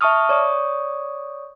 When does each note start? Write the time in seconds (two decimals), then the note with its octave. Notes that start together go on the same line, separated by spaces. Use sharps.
0.01 E5 A5 C#6 D#6 F6
0.29 C#5 D5 C#6 D#6